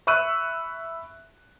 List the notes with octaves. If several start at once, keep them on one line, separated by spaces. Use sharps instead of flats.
E5 B5 C#6 E6 F#6 D#7